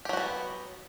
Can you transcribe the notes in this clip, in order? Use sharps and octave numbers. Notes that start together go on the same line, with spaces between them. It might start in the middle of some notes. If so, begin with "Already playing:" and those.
F#3 B3 F#4 G4